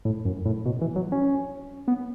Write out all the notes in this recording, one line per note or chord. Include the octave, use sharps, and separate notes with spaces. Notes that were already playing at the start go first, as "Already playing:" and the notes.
A2
F#2
A2
B2
E3
F#3
C#4
B3